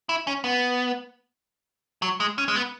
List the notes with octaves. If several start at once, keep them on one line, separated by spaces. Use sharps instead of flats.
E4
C#4
B3
F#3
G#3
C#4
G#3
B3